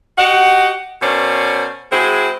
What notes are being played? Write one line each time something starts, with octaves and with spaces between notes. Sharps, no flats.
F#4 G4 D#5 F#5
B2 C#4 A#4 C5 D5
G#3 C4 E4 F#4 G#4